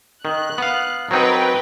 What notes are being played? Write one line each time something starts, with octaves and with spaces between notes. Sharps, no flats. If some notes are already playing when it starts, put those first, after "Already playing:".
D#3 F#6
B3 F5
F#3 C4 D#4 A#4 B4 G5